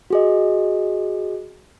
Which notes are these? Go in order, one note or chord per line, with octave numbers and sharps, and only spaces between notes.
F#4 G#4 D#5